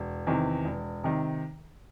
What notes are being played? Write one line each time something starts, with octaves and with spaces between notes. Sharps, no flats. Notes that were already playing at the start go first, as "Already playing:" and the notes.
Already playing: E1
E2 C3 D#3
E1
C3 D#3